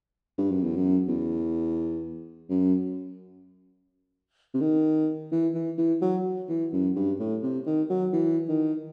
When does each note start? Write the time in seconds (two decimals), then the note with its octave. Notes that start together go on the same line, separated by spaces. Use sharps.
0.38 G2
0.51 F#2
0.63 E2
0.76 F#2
1.08 E2
2.49 F#2
4.54 C3
4.61 D#3
5.32 E3
5.55 E3
5.78 E3
6.01 F#3
6.49 E3
6.72 F#2
6.96 G2
7.19 A2
7.42 C3
7.66 D#3
7.89 F#3
8.13 E3
8.48 D#3